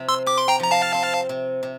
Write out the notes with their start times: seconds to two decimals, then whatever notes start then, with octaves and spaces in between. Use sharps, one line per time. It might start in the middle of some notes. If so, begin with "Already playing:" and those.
Already playing: C3 F3 C4
0.09 C6 E6
0.26 G4 D6
0.38 C6
0.48 G5 A#5
0.60 F3 A#5
0.71 F5 A5
0.94 C4
1.29 C3
1.63 C3